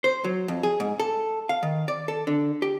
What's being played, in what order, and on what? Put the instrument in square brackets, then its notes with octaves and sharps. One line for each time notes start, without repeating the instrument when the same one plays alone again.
[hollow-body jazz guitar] C5
F#3
F2
G#4
G#2
A4
F5
D#3
D5
A4
D3
G4